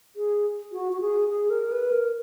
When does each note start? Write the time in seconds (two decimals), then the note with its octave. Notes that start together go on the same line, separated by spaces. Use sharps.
0.16 G#4
0.73 F#4
0.93 F#4
1.01 G#4
1.29 G#4
1.50 A#4
1.72 B4
1.92 A#4